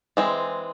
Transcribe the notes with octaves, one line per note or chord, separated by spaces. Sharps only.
E3 G#3 C4